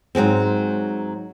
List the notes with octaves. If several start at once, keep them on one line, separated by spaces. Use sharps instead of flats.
G#2 F#3 G#3 C4